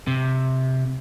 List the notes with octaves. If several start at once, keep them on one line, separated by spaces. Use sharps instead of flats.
C3